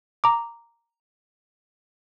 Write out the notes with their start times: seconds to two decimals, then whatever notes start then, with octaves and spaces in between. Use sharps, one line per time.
0.24 A#5 D6